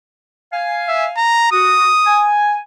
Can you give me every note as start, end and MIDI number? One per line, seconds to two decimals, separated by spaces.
0.52 1.16 77
0.52 1.16 80
0.88 1.07 76
1.17 1.50 82
1.52 1.87 66
1.52 2.28 87
2.07 2.57 80